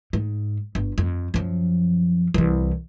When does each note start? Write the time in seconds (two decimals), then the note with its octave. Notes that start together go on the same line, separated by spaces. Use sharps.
0.13 G#2
0.75 G1
0.98 F2
1.34 F#2 F3
2.34 C2 E3